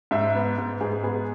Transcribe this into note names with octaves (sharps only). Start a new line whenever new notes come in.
G#2 E5
B3
G#2
G#2 G#4
B3 G#4